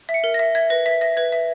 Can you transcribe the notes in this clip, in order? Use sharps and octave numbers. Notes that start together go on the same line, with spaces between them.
E5
C#7
A#4
A#6
E5
E5 G#6
B4 A#6
E5 B6
E5 A#6
B4 G#6
E5